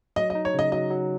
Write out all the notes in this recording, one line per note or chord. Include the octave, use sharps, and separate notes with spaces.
F#3 D#5
D#5
D#4
C#5
C#3 D#5
F#3 D#5
F#3